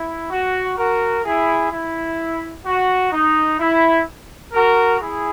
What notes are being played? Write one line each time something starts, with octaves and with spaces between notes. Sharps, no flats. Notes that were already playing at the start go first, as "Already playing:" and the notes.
Already playing: E4
F#4
F#4 A#4
E4 G#4
E4
F#4
D#4
E4
F#4 A#4
E4 G#4